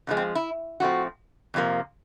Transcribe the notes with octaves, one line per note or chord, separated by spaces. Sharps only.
F2 D3 F3 G#3
C4
E4
A2 F3 A3 C4 F#4
F2 C3 F3 A#3